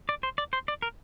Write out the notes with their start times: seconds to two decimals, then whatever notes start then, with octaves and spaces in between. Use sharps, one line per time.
0.09 D5
0.23 C5
0.38 D5
0.53 C5
0.68 D5
0.82 A#4